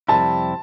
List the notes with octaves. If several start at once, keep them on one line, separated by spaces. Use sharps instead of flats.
F2 C3 G3 C4 E4 A5